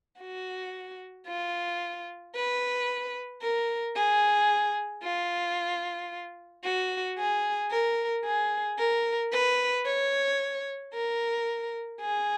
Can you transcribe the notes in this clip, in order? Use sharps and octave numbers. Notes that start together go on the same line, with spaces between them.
F#4
F4
B4
A#4
G#4
F4
F#4
G#4
A#4
G#4
A#4
B4
C#5
A#4
G#4